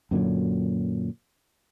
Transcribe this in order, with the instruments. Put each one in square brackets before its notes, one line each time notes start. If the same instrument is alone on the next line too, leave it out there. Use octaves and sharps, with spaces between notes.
[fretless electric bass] F#2 A#2 D3 F#3